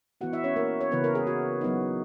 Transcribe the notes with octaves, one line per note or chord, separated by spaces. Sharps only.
E3 B3 E4 F#4 F#5
E4 E5
C#4 C#5
A#3 A#4
C#5
C#3 E3 B3 B4
A#4
G#4
F#4
F#3 B3 D#4